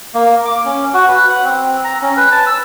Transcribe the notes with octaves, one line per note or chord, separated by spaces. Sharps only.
A#3
D6
C#4
F#4
B4
F#5
C4
A#5
C#4
B4
A5
E6